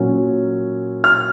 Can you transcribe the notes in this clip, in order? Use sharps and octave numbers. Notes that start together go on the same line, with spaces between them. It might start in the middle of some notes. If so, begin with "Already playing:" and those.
Already playing: A#2 F#3 C#4
F6